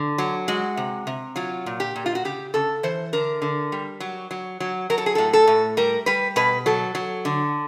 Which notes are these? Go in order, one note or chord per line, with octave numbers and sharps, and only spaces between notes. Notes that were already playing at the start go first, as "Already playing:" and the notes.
Already playing: D3
F#3
G#3 F#4
C3
C3
F#3 F4
A#2
G4
A#2
F4
F#4
C#3 G4
C#3 A4
E3 C5
D3 A#4
D3
G3
F#3
F#3
F#3
F#3 A#4
A4
G#4
A2 A4
A4
A2
G3 A#4
G3 B4
B2 B4
F#3 A4
F#3
D3